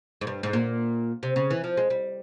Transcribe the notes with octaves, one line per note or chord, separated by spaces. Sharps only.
G#2
G2
G#2
A#2
C3
C#3
E3
F3
G#3
G3